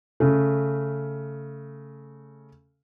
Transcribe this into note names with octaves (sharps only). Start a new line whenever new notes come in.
C#3 A3